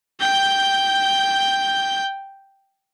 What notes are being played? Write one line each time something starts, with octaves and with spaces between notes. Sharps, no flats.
G5 G6